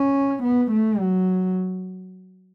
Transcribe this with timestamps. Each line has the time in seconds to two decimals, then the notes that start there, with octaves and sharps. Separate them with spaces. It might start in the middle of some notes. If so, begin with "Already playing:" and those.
Already playing: C#4
0.44 B3
0.72 A3
1.00 F#3